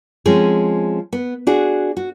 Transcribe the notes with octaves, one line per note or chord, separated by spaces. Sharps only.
F3 G#3 C4 C#4 G#4
B3
D4 F#4 G#4
F#4